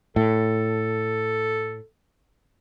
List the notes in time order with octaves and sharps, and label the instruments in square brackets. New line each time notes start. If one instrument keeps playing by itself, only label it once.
[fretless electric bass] A2 [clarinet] A4